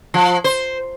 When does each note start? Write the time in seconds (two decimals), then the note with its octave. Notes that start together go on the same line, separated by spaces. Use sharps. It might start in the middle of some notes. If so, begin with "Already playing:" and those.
0.14 F3
0.44 C5